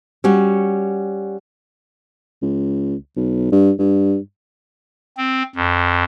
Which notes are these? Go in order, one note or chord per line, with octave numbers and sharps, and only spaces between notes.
G3 C#4 F#4
C#2
B1
G2
G2
C4
F2